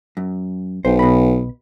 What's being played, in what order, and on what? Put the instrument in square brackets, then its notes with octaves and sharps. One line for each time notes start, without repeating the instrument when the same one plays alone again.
[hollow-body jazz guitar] F#2
[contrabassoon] B1 [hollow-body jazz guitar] C5
[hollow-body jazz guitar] B2 B5